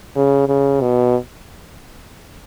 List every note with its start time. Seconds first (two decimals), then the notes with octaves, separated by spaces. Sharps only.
0.16 C#3
0.48 C#3
0.82 B2